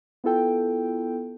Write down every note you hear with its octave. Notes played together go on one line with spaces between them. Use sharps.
B3 E4 F4 A4 G5